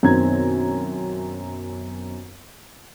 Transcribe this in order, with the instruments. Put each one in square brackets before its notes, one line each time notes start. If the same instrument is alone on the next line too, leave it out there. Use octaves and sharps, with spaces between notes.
[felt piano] F#2 B2 D#3 C4 A#5 G#6